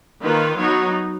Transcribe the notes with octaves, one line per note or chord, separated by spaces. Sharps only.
D#3 A#3 F4 B4
F#3 B3 D#4 C#5